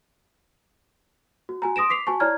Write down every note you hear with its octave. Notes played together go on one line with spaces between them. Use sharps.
F#4
F#4 G#5 A#5
C6 D#6 A#6 D7 E7
D6 B6 C7 F7
F#4 G#5 A5 C#6
E4 C#5 D5 A#5 F6 G#6